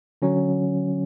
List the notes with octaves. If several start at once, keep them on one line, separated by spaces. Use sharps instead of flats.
D3 F#3 C#4